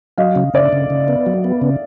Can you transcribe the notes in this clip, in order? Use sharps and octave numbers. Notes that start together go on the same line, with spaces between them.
F#3 D#5 F5
C#3
C#3 D5 E5
C#3
C#3
B3
F#3
B3
C#3